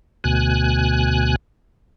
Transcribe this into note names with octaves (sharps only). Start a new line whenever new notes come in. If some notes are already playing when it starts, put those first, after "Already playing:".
D2 B2 G#5 F#6